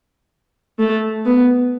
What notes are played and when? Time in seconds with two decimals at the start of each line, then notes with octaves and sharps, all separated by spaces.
0.79 A3
1.25 B3